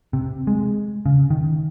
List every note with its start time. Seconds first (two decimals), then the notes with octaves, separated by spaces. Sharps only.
0.13 C3
0.47 G#3
1.06 C#3
1.31 D#3